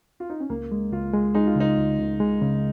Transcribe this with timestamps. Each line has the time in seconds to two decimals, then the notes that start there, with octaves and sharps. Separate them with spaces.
0.20 F4
0.30 D#4
0.40 C#4
0.50 C#2 A#3
0.72 G#3
0.92 C#2 F4
1.14 G#3
1.35 G#3 D#4
1.47 F4
1.56 C#3 D#4
1.77 C#2
1.99 C#2
2.20 G#3
2.41 C#3